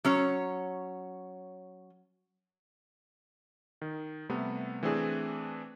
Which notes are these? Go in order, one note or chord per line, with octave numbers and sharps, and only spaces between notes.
F#3 C#4 C#5
D#3
C3 G3 A3 B3
E3 A3 C4 D4 G#4